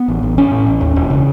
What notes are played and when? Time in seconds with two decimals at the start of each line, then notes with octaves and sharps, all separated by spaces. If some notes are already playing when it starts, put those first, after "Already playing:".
Already playing: B3
0.08 A1
0.23 A1
0.38 A2 C#4
0.51 A2
0.67 A1
0.81 D#2
0.96 E1
1.10 C#3